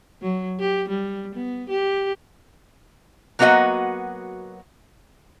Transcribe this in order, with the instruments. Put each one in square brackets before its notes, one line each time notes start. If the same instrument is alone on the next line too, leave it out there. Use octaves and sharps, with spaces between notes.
[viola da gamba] F#3
G4
G3
B3
G4
[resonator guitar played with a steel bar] F#3 A#3 B3 F#4 D#5 F#5